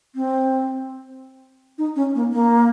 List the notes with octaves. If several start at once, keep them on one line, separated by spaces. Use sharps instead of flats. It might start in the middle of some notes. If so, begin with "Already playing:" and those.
C4
D#4
C#4
A#3
A#3